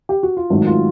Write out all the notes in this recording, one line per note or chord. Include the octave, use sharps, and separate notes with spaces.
G4
F#4
F4
G#1 G#2 D#3 F#3 A3 E4
F4